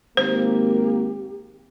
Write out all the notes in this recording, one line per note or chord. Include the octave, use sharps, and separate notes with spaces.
G#1 A#3 G4 C5